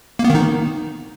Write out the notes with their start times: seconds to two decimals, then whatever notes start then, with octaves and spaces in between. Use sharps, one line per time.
0.19 A#3
0.25 B3
0.30 D#3
0.35 D#4